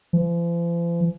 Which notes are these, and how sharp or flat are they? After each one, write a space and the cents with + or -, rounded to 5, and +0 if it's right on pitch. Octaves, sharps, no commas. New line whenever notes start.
F3 -45